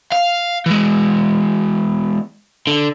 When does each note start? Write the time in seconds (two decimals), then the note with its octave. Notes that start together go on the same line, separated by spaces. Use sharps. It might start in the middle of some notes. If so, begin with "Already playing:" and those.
0.13 F5
0.66 E3 G#3
2.67 D3